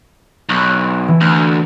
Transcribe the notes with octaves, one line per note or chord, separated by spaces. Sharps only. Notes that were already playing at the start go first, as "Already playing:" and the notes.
B1 C#6 D#6 F#6
E3
D2